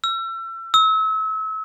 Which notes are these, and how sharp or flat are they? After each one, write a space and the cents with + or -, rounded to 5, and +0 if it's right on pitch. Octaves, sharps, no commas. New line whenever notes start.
E6 +35
E6 -35